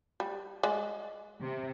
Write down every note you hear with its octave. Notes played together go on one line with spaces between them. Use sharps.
G3
G#3 D5
C3